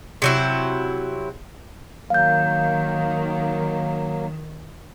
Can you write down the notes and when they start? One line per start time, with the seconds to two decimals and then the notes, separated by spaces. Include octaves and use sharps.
0.22 C3 F#3 E4
2.10 D#3 F#3 A#3 F5 G6